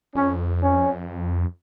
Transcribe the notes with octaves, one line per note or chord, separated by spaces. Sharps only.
F2 C#4
C#4